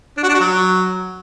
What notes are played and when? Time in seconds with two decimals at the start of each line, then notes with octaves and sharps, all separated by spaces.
0.18 D4
0.23 F#4
0.29 D4
0.35 F#4
0.40 F#3